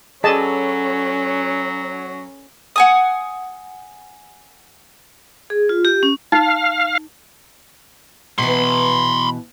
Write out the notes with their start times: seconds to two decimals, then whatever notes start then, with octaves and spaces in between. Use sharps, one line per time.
0.24 F#3 C#4 G#4 A4 B4 D5 D#5 A5
2.76 F#5 G#5 D#6
5.50 G#4
5.69 F4
5.85 G4
6.03 C#4
6.32 D#4 F5
8.38 B2 E3 B5 C6